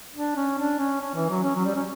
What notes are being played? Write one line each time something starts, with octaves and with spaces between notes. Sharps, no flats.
D4
C#4
D4
C#4
C#4
E3
F#3
C#4
F#3
G3
C#4